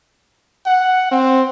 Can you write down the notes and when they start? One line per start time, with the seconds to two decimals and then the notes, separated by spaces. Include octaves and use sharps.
0.66 F#5
1.12 C4